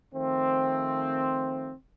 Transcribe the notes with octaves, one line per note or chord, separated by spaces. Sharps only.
D#3 F3 A3 C4